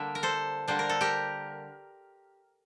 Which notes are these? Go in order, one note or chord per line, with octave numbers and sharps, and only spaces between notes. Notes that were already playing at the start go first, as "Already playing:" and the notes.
Already playing: D3 G3 A#3 D4 E5
A#4
A4 C5
D3 G3 A#3 D4 C5
A#4
A4
G4 A#4